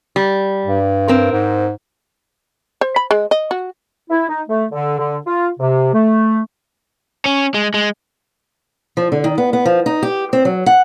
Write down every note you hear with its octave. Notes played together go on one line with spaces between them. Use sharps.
G3
G2
C4 A#4
G#2
C5
B5
G#3
D#5
F#4
E4
D#4
A3
D3
D3
F4
C3
A3
C#4
G#3
G#3
F3
D3
D#3
B3
B3
F3
D#4
G4
C4
F#3
F#5